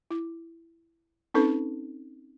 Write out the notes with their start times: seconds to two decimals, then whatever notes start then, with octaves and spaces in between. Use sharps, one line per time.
0.11 E4
1.34 C4 C#4 D#4 A4 B4